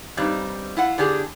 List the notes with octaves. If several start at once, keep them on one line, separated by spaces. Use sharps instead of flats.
G2 G3 C4 D#4
E4 F4 F#5
D3 D4 G4 G#4